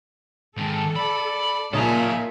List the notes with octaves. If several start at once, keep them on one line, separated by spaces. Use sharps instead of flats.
G#2 D#3 A4
D5 B5
A#2 C#3 D#4 A4 E5 F5 G#5 D#6